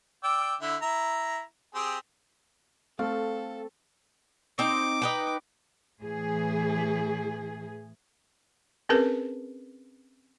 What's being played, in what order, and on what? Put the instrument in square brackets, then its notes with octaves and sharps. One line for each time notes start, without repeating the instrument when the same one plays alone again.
[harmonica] D5 G5 E6
D3 E4
E4 A#5
C4 G4 G#4
[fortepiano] A3 [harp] C4 [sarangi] A4 [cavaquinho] F5
[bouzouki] C4 D#4 [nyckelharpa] D6
[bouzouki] D#4 B4 G5
[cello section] A2 E3 G#4
[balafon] C4 C#4 G#4 A#4 B4